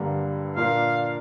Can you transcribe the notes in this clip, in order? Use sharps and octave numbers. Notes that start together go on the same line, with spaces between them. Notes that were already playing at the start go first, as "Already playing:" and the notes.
Already playing: G2 D3 G3 A#3
A#2 A#3 D4 A#4 F5